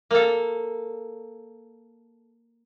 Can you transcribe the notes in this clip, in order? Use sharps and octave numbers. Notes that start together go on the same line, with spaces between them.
A#3 A4